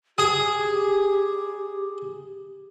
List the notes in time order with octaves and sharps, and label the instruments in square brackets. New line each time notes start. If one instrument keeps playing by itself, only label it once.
[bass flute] G4 [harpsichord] G#4